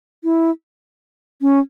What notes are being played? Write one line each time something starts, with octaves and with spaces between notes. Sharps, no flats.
E4
C#4